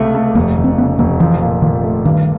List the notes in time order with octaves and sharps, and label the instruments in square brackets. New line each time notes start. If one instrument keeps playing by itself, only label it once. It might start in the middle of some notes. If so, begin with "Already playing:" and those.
Already playing: [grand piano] C#2 C3 A3
A3
[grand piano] F1 [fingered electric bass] A#3
[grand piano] F1
[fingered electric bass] C4
[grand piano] C#3 [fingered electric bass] B3
[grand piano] F1 [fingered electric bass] A#3
[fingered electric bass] E3 [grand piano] F3
[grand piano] A#2
[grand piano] A#2 [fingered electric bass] D#3
[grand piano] A3
[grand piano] G2 [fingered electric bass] D#3